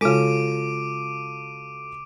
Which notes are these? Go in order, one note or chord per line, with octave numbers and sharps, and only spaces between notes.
C#3 G#3 F4 F#4 A4 D6 D7 D#7